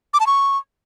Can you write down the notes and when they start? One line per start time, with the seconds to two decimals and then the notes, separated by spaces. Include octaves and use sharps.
0.14 D6
0.20 A5
0.27 C#6